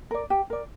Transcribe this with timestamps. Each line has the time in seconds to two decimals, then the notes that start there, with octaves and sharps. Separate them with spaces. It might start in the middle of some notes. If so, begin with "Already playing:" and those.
0.11 A#4 D5
0.30 G4
0.50 A#4 D5